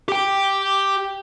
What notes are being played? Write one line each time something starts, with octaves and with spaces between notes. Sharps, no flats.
G4 G5